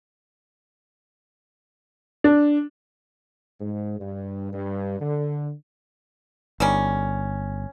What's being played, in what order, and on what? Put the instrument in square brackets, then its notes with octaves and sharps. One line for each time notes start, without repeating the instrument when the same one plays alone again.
[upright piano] D4
[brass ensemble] G#2
G2
G2
D3
[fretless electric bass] G1 [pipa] D#3 G3 C#4